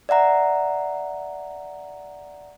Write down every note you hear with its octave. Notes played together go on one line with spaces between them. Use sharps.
D5 E5 F#5 A#5